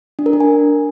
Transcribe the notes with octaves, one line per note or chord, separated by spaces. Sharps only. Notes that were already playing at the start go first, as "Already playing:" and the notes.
D4
A#4
D4
G#5